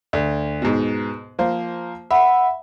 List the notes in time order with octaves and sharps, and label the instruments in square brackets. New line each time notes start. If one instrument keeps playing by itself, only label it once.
[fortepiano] D2
G#2 B2
F3 A#3 C5
[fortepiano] E5 [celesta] F#5 B5